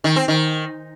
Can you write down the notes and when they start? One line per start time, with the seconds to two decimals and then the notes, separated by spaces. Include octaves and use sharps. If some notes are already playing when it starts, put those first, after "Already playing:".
0.04 D#3
0.16 C4
0.28 D#3